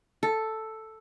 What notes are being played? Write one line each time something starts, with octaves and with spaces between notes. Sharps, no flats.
A4